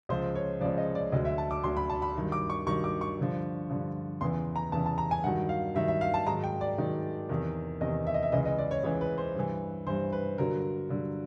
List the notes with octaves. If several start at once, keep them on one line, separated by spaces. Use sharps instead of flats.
C#2 C#3 F3 C5
C#5
C#2 C#3 F3 D5
D#5
D5
D2 D3 F#3 D#5
E5
A5
D6
D2 D3 F#3 C6
B5
A5
B5
G2 D#3 F#3
D6
C#6
G2 D#3 F#3 C#6
D6
C#6
G2 D3 F3
G2 D3 F3
E2 C#3 E3 C6
A#5
E2 C#3 E3 A5
A5
A#5
G#5
G2 D#3 F#3 F#5
F5
G2 D#3 F#3 E5
E5
F5
A5
G#2 D#3 F#3 A#5
G5
D5
G#2 D#3 F#3
E2 C3 D#3
E2 C3 D#3 D#5
E5
D#5
E5
C#2 C#3 E3 D#5
D#5
D5
C#5
C#2 C#3 E3 C#5
B4
C5
G2 E3
G2 E3 C5
B4
G2 D3 F#3 A#4
G2 D3 F#3